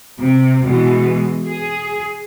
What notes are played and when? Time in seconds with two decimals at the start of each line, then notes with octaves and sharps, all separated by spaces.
0.19 C3
0.65 B2 E3 G#3
1.47 G#4